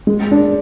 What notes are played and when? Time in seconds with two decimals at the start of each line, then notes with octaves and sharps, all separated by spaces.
0.07 G#3
0.31 D4